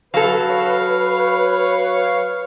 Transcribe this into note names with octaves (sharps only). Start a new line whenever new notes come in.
F#3 A4 B4 F5
C#5 F5